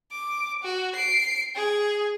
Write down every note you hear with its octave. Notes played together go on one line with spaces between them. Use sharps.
D6
F#4
C7 D7
G#4